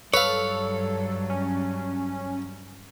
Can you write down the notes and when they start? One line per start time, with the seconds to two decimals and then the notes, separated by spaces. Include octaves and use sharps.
0.14 G2 F#3 A4 B4 C#5 F5
1.30 C#4